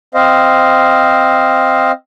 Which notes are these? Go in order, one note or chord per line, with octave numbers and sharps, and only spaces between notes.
C4 C5 D#5 F5